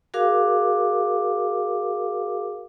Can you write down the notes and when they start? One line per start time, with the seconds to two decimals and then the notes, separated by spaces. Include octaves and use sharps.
0.14 F#4 G#4 A#4 F5 D6